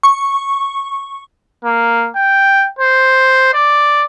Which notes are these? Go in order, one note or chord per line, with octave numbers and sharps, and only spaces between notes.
C#6
A#3
G5
C5
D5